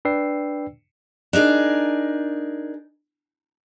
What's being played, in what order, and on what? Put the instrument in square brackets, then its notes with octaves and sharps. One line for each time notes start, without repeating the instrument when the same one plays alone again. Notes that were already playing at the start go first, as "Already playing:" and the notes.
[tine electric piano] D4 B4 D5 G5 E6 C7
[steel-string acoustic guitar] D4 D#4 G#4 A#4